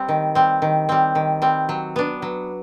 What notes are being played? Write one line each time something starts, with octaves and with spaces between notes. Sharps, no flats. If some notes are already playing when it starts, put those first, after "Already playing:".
Already playing: G3 C4
D#3
G3 C4
D#3
G3 C4
D#3
G3 C4
F#3
B3 D4
F#3